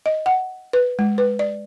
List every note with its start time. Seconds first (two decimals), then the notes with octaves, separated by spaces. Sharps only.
0.06 D#5
0.26 F#5
0.73 B4
0.99 G#3
1.18 B4
1.39 D5